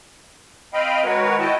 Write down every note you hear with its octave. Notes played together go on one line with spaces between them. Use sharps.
C4 D#5 F5 G5 B5
D#3 G#3 F#4 A#4 B4 C#5
E4 F#4 D#5 G5 A5